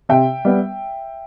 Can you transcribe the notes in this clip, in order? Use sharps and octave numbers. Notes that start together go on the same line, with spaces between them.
C3 E5 G5
G3 B3